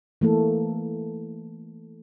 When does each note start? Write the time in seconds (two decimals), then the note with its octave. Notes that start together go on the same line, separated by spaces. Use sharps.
0.21 E3 A3 A#3 A4